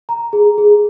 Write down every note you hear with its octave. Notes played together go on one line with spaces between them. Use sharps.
A#5
G#4
G#4